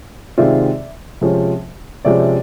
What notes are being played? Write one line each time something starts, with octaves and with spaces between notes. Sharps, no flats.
C3 D#3 G#3 C4 F4 D5 E5
C3 F3 G#3 C#4
C3 F3 G#3 C#4 D5 E5